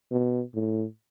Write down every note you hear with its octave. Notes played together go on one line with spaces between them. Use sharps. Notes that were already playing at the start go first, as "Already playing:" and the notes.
B2
A2